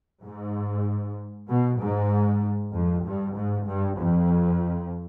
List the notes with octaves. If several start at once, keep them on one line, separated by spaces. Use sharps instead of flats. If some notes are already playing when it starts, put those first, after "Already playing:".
G#2
B2
G#2
F2
G2
G#2
G2
F2